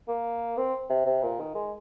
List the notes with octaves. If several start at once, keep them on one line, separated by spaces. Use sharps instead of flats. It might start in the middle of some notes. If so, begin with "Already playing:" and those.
A#3
C4
C3
C3
A#2
D#3
G#3